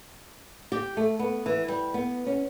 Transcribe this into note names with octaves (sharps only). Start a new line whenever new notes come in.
G4
A3
B3
E3
G3
B3
C#4